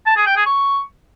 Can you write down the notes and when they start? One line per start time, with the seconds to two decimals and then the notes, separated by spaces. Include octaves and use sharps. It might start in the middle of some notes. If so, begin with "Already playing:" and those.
0.07 A5
0.16 G#4
0.26 G5
0.36 G#4
0.46 C#6